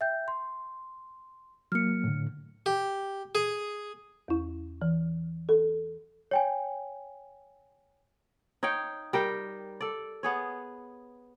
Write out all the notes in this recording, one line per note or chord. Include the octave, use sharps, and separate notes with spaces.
E5 G5 G6
C6
F#3 A#3 F6 C#7
A2 D3
G4
G#4
E2 E4
E3
A4
C#5 G5 G#5
D#4 C#5 F5 G5
G3 A#4 G5
A4 D5
B3 G#4 C#5